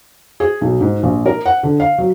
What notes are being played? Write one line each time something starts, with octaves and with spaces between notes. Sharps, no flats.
G#4
B1
G#2
A#1
A#4
F#5
D3
F5
F#3